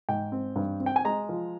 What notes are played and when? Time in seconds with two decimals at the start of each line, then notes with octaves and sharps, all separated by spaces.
0.09 G#2 G5
0.32 C4
0.56 G2
0.80 C4
0.86 G5
0.96 G#5
1.05 G#3 A#5
1.29 F3